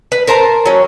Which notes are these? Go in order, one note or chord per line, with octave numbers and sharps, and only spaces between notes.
B4
A#4 C5 A5 A#5
F#3 C#4